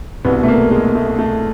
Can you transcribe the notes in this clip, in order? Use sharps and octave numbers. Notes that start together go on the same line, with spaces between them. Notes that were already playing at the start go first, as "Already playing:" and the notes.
C2 B2 B3
A3
A#3
G#3
A3
A3